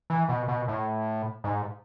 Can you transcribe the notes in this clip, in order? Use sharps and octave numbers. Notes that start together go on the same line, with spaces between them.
E3
B2
B2
A2
G#2